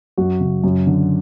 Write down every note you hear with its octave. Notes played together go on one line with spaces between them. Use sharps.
F#2 F#4
C#3
F#2
D3